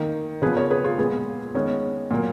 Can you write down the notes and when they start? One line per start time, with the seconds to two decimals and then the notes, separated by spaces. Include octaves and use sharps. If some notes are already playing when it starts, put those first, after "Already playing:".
Already playing: D#3 A#3
0.42 C#3 F3 B3 G#4 B4
0.56 A#4 C#5
0.70 G#4 B4
0.84 F4 G#4
0.98 A#2 G#3 B3 G#4 B4
1.54 D#3 G#3 B3 C#4
2.11 A#2 F#3 A#3